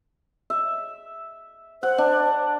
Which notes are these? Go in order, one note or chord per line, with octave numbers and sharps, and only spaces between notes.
E5
C5 F#5
D4